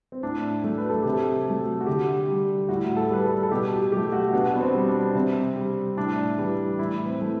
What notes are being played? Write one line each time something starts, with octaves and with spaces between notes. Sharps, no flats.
C4
A2 D4
D4
F#3 A3
B4
A4
C3 G4
A4
F#3 A3
F#4
D3 G4
G3
A2 F#4
A4
G3 B4
A4
A4
B2 G4
G4
F#3 A3 G4
F#4
B2 D4
B3
C4
G3
D4
C3 C4
G3
A2 D4
E3 G3
A2 E4
C4
E3 A3